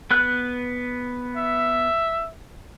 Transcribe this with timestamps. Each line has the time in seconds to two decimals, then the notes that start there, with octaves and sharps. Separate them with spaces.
0.11 B3 B4 F#6
1.36 E5